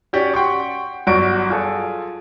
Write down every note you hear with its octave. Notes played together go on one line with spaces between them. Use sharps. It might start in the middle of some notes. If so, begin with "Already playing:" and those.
C#4 F#4 G4 D5 F#5
F#5 G5 C6 C#6
G1 F#3 F#4 D5 C#6 D7
F4 G#4 A4